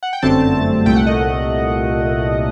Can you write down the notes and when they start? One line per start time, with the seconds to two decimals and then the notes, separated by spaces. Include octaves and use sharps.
0.03 F#5
0.13 G5
0.22 G1 F#2 D3 A3 C4 A5
0.86 C2 A#2 A3 G5
0.96 F#5
1.07 D#5